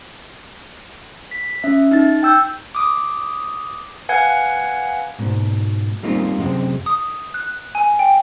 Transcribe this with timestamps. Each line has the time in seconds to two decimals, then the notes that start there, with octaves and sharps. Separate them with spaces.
1.31 B6
1.64 C#4 E5
1.91 D#4 A6
2.23 G5 E6 G6
2.75 D6 D#6
4.09 B4 F5 F#5 G#5 G#6
5.19 G#2 B2
6.03 G3 A#3 C4 D#4 F4
6.38 F#2 C3 G#3 C4
6.86 D#6
7.34 F#6
7.75 G#5
7.99 G5